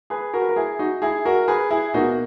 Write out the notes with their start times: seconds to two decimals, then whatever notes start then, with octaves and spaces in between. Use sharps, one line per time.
0.10 G#4 B4
0.34 F#4 A#4
0.42 B4
0.49 A#4
0.56 E4 G#4
0.79 D#4 F#4
1.02 E4 G#4
1.25 F#4 A#4
1.48 G#4 B4
1.70 E4 G#4
1.94 B2 A#3 D#4 F#4